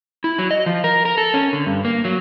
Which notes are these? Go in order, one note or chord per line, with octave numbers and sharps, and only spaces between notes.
E4
F#3
D#5
F3
A#4
A#4
A4
C#4
D3
G2
A#3
F#3